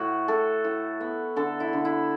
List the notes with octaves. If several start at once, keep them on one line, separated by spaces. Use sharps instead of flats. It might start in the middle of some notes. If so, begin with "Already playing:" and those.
Already playing: A2 F#4
A2 A4
A2
B3
D3 A4
E4
D3
E4